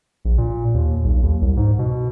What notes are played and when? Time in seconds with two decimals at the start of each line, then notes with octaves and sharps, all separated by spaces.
0.25 A#1
0.38 A#2
0.74 D#2
1.04 B1
1.23 D#2
1.41 C2
1.57 G#2
1.79 B2